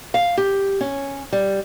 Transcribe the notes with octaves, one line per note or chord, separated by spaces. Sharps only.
F5
G4
C#4
G3